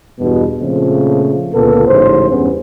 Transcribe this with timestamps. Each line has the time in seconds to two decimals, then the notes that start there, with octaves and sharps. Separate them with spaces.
0.19 E2 G2 B2
0.61 A#2 C#3 F3 A3 C4
1.54 C#2 A#2 D3 B3 A4
1.87 A1 G#2 C#3 C5
2.30 E2 G2 B3 C#4